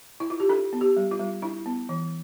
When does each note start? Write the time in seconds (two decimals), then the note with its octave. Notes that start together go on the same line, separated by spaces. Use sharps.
0.20 E4
0.30 F4
0.40 G4
0.49 D4 A4
0.73 B3
0.81 G4
0.97 G3
1.11 F4
1.19 G3
1.42 D4 E4
1.66 B3
1.89 E3